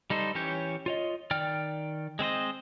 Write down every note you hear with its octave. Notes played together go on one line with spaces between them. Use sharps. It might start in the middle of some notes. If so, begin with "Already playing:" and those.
G3 D#4 A4 C5
E3 C#4 G4 C#5 G6
F4 C#5 D#5
D#3 D5 G5 F6
G#3 C4 C5 D#5